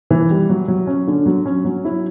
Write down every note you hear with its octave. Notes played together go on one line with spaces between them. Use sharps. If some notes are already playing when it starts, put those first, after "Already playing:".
E3
G3
F#3
F#3
C#4
D3
F#3
C#4
F#3
E4